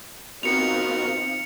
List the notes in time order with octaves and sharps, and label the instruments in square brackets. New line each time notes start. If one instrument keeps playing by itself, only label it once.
[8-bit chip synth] B3 F#4 A#4 [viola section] C4 D#4 F4 [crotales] C#7 F7